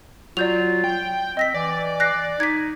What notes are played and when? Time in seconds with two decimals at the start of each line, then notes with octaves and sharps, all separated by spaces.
0.37 F#3 F4 D5 G6 F7
0.84 G5
1.37 C4 D#5 A#6 B6
1.54 E3 D5
2.00 F#6 A#6 C7
2.40 D#4 G#6 B6